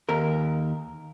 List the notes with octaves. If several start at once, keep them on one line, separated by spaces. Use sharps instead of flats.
D#2 A#4